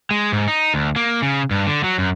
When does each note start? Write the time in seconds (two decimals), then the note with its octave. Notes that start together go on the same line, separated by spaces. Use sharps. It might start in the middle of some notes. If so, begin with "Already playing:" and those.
0.11 G#3
0.32 G#2
0.48 D#4
0.74 D2
0.96 A#3
1.22 C#3
1.51 G2
1.67 D3
1.84 F#3
1.98 F#2